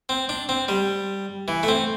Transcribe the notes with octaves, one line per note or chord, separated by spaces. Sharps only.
C4
D4
C4
G3
E3
A3
C4